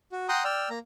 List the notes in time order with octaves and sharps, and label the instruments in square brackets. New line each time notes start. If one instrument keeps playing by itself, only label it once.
[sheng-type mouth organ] F#4
F#5 G5 A#5 C6 D#6
D5 G5 E6 F6
A#3 A#5